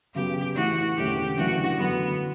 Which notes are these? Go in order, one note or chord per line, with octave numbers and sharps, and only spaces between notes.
F#2 C#3 F#3 B3 G4
A2 E3 A3 F#4
E1 E2 D3 A3 C#4 G4
F#2 C#3 E3 A3 D4 F#4
F#2 D3 F#3 B3